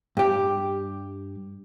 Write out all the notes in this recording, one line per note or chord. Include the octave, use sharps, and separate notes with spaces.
G2 G4